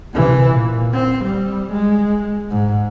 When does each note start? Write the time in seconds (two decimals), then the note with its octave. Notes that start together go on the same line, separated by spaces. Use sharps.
0.14 C3 E3
0.52 A#2
0.93 C4
1.25 G3
1.73 G#3
2.51 G#2